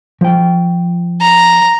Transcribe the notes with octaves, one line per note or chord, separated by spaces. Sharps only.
F3 G5
A#5